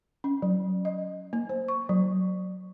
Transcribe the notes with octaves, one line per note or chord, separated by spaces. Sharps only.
C#4
F#3
D#5
A#3
C5
C#6
F#3